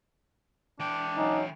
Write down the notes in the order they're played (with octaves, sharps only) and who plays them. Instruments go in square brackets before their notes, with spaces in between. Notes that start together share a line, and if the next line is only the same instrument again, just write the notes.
[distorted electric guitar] E3 G5 [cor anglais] D4
[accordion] F#3 C#4 [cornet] D#4